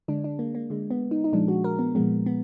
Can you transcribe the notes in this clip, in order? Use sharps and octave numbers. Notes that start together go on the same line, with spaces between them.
D3 G#3 D4
D4
A#3
A#3
D3 G#3
B3
D#4
D#4
A#2 F3 G#3 D4
F#4
A#4
B3
A#2 F3 G#3 B3
B3